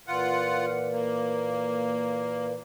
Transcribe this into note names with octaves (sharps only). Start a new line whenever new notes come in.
A#2 E3 F4 F#5
A#3